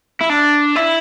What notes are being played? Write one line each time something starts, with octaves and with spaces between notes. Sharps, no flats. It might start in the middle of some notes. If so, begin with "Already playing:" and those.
E4
D4
E4